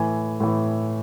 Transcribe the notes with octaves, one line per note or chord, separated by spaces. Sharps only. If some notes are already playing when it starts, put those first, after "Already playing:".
Already playing: A2 E3 G#5
A2 E3